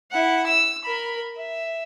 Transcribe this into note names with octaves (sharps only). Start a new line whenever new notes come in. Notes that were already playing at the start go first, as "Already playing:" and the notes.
E4 F#5
E6
A#4 B5
E5